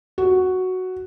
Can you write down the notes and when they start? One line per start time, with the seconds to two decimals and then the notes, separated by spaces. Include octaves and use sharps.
0.18 F#4